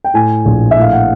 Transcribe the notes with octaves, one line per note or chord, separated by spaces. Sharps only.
G5
A2 G#5
A#1
E5
A2 F5
F#5